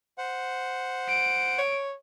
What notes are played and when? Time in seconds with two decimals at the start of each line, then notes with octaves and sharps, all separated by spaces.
0.18 C5 F#5
1.09 D7
1.58 C#5